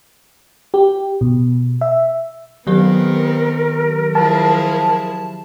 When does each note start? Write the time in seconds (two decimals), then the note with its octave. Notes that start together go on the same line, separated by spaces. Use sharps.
0.74 G4
1.21 B2
1.81 E5
2.67 D#3 F#3 B3 C4 D#4 G4 A#4
4.15 F3 E4 G#4 A5